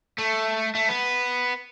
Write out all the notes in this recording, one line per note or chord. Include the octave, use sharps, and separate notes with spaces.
A3
A3
B3